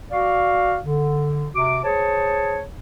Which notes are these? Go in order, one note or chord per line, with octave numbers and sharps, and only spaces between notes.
F#4 D5 F5
D3
C3 F#4 D6
G#4 C5 C#5 A5